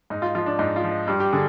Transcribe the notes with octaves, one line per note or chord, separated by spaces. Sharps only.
G#2 D#4
F4
F3 F4
D4
G#2 D#4
F4
F3
D#4
G2 G4
G4
D3 G#4